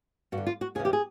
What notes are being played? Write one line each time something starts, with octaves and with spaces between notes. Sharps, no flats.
G2 F#4
D3
F4
F#4
D#2 C#3 E3 G#4
G4
G#4